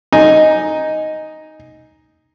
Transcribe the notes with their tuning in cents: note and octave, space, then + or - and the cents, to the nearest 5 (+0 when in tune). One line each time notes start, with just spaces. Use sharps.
D#4 +0 G#5 +0